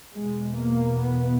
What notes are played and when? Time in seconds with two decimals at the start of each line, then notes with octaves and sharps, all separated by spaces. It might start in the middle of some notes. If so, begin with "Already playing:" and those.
0.14 E2 B2 G#3
0.57 A#3
0.99 B3